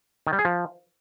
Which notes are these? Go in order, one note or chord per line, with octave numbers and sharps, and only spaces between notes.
D#3
G3
G#4
F3